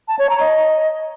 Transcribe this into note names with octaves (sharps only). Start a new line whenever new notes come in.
A5
C#5
A#5
D#5